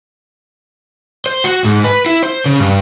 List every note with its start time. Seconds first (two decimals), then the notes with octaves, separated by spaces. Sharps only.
1.26 C5
1.44 F#4
1.64 G#2
1.84 B4
2.06 E4
2.23 C5
2.46 C#3
2.60 G2